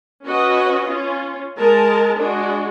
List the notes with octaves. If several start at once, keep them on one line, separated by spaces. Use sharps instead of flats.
C#4 F#4 B4 D#5
C#4 F4
G#3 A#4 A5
G#3 D4 F#4